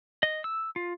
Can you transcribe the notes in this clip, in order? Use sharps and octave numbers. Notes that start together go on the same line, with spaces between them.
D#5
E6
F4